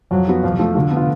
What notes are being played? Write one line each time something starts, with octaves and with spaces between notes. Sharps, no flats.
F2 F#3
F3 B3 F#4
F2 F3
F3 A3
D3 F3
B3
F4